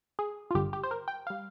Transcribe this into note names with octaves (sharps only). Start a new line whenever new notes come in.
G#4
F4
G#1 G2 D3 G3 G4
G4
C5
A#4
G5
G3 F5